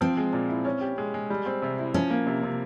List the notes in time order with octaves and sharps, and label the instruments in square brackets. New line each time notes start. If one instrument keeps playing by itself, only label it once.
[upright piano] F3 [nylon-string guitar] C4
[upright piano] G#3
A#2
E4
C#4
G4
G#3
G#3
G3
C4
C3
E4
[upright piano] F3 [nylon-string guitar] C#4
[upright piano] A#3
C3
C3